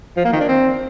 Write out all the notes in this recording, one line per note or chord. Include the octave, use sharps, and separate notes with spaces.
F3
A#3
D#3
D4
C4